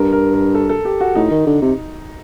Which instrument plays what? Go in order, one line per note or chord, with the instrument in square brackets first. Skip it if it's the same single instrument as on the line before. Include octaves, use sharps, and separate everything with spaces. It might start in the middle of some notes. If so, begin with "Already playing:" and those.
Already playing: [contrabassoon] G2 [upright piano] A#4
[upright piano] A#4
A#4
A4
A4
G4
F#4
[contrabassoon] A2 [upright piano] D#4
[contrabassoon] D#3
D3
C3